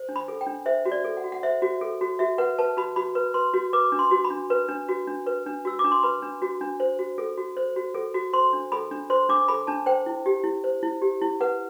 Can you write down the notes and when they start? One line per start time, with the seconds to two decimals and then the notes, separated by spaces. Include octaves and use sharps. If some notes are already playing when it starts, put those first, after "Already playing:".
Already playing: C5
0.09 D4
0.16 B5
0.28 A4
0.41 G5
0.47 D4
0.66 C5 E5
0.85 F#4
0.92 D5
1.04 A4
1.17 F#5
1.24 F#4
1.32 F#5
1.43 C5 E5
1.62 F#4
1.81 A4
2.01 F#4
2.19 F#4 E5
2.38 B4 F#5
2.58 B4 A5
2.77 F#4 B5
2.96 F#4 B5
3.15 B4
3.34 B4 C6
3.54 F#4
3.73 B4 D6
3.92 D4
3.99 C6
4.11 F#4
4.25 B5
4.30 D4
4.50 B4
4.69 D4
4.89 F#4
5.07 D4
5.26 B4
5.46 D4
5.65 F#4 E6
5.79 D4 D6
5.92 C6
6.03 B4 B5
6.23 D4
6.42 F#4
6.61 D4
6.80 C5
6.99 F#4
7.18 A4
7.38 F#4
7.57 C5
7.76 F#4
7.94 A4
8.14 F#4
8.33 C5 C6
8.53 D4
8.72 A4 B5
8.91 D4
9.10 C5 C6
9.29 D4 D6
9.48 A4 B5
9.67 D4 A5
9.86 C5 G5
10.06 E4
10.26 G4
10.44 E4
10.64 C5
10.83 E4
11.02 G4
11.22 E4
11.40 B4 F#5